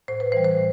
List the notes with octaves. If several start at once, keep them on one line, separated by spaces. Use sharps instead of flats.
A2 C5
B4
E3 G3 C5
C5
A2